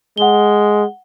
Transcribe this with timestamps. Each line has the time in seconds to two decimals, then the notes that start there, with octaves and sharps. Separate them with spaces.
0.18 G#3 F#5 G7